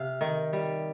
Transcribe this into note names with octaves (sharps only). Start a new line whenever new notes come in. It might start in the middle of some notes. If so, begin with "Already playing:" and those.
Already playing: C3 F5
D#3
G3